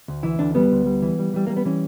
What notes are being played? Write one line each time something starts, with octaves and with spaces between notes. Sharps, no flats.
D2
E3 E4
D2 D4
G3 B3
D2
G3
E3
G3
E3 G3
G3 A#3
B3
E3 C#4